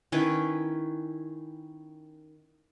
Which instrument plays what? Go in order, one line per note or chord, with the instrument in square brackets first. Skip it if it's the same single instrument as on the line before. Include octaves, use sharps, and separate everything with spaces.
[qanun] D#3 C#4 E4 B4